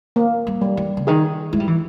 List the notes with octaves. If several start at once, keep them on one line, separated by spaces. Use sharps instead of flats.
A#3
G3
G3
E3
C#3
D#3 G#4
G#3 E4
G3
E3